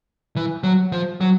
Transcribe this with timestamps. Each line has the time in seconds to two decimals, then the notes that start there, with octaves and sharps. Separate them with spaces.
0.36 E3
0.63 F#3
0.92 F3
1.21 F#3